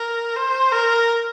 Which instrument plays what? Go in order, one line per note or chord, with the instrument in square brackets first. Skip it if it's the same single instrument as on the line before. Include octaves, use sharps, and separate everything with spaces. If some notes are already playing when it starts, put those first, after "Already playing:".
Already playing: [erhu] A#4
C5
A#4